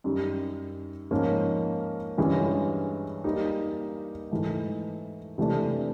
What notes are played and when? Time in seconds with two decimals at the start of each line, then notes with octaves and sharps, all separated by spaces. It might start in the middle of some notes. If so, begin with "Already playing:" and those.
0.04 F#2 D#3 G3
1.11 G#2 F3 A#3 C#4
2.18 G2 E3 G#3 C#4
3.24 G3 A#3 D#4 G4
4.31 G#2 E3 A3
5.38 C3 E3 A3 D4